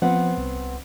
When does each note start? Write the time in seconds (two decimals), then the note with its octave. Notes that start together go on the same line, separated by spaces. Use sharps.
0.02 F3 B3 C4 F#5
0.37 C2